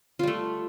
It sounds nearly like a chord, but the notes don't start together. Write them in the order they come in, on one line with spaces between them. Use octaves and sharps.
F4 G3 A3